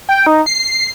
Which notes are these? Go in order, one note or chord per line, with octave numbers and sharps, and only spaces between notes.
G5
D#4
C7